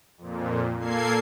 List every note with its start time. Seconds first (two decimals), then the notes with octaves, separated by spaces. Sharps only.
0.18 F2 A#2
0.79 A#2 A#3 A4 G#6 C7